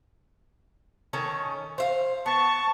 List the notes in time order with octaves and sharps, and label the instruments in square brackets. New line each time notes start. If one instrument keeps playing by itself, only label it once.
[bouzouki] D#3 C#4 A4
C5 E5 F5
[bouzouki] B3 [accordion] A5 C#6